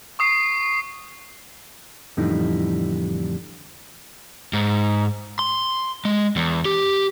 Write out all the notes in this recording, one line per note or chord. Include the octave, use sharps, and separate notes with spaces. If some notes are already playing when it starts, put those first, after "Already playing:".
C#6 D#6 C7
F2 A2 D3 E3 G3 D#4
G#2
C6
G#3
E2
G4